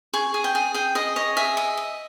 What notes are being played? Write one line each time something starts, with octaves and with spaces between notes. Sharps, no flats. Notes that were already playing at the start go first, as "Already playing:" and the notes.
G#4 C#6
G#4
G5
G#4
G#4 G5
G#4 D#5
C#5 D#5
G#4 E5
D#5
D#5